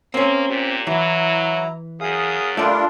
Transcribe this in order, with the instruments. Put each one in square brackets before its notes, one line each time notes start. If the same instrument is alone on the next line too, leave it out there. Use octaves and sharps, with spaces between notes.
[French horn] A#3 [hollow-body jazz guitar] C4 C#4
[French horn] A#2 [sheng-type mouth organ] G4 D6
[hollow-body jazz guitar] E3 [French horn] F#3 [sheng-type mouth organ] E4 A#5
[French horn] F#2 [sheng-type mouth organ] G#4 F5 D#6
[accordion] G3 D4 F4 [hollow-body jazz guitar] A3 D5 [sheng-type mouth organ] A4 A#4